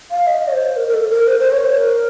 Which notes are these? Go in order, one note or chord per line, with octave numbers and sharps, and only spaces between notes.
F5
D#5
C#5
C5
A#4
A#4
A4
A#4
C5
C5
C#5
C5
A#4